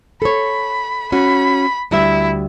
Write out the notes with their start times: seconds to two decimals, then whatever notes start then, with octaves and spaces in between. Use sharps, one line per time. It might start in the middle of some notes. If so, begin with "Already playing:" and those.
0.22 A4 C#5 B5
1.12 C#4 F#4 B5
1.91 D2 G3 E4 E5